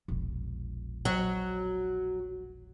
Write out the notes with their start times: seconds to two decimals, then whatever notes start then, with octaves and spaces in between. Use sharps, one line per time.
0.08 E1 A#1
1.05 F#3